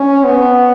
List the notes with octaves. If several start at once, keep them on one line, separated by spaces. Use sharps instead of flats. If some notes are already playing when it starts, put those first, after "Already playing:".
Already playing: C#4
B3